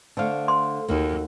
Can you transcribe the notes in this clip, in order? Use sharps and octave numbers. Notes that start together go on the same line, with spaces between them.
D3 A3 A4 C5 F5
C6
D#2 A#3 F#4